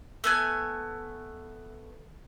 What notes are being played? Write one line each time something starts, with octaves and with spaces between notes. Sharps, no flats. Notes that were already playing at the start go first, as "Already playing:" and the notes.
A3 B3 G#5